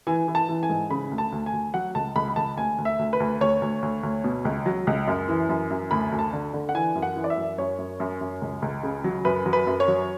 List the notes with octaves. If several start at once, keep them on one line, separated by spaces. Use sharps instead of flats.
E3 G#5
E3
A5
E3
G#5
G#2
C#3 B5
D2
A5
D2
G#5
D2
F#3 F#5
C#2 A5
C#2 B5
B5
C#2 A5
D2 G#5
D2
E5
D2
B4
D2
D2 C#5
D2
D2
D2
B2
C#2
F#3
C#2
F#2
E3
F#2
F#2
D2 B5
D2
A5
D3
D3
F#5
E3 G#5
F#2
F#5
E3
D5
E5
F#2
F#2 C#5
F#2
F#2
F#2
C#2
C#2
C#3
F#3
F#2 B4
F#3
B4
F#2
C#5
F#3